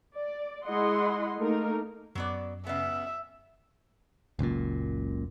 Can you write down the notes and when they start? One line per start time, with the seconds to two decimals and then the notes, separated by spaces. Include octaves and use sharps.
0.16 D5
0.65 G#3 E4 D#5 F#5 C6
1.38 A3 A#3 D#4 A#4
2.15 F#2 F#3 B3 D5
2.67 C#3 B3 E5
4.39 F#1 C#2 F#2 A#2